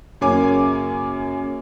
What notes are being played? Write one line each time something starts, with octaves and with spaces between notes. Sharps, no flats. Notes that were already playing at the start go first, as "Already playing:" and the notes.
F#2 C#3 A#3 C#5 G#5 D6